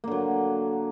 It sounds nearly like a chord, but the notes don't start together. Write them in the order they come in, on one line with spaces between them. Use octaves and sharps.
A#3 D3 F#3